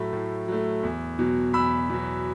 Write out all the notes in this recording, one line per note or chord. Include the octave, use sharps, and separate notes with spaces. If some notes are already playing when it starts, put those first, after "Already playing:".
Already playing: A2 F#3 A3 B5
A2
F#3 A3
E2
B2 F#3
E2 B5 E6
B2 F#3